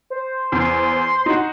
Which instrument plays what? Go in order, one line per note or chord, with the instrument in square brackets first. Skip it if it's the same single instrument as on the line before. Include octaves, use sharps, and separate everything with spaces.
[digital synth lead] C5
[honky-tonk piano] E2 [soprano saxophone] C6
[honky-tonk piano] D#4 F#4